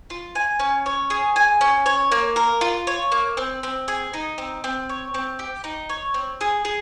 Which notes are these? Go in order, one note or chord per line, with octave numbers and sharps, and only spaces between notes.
F4
G#5
C#4
C#5
G#4
G#5
C#4
C#5
A#3
A#4
F4
C#5
A#3
C4
C4
G#4
D#4
C4
C4
C#5
C4
G4
D#4
C#5
C4
G#4
G#4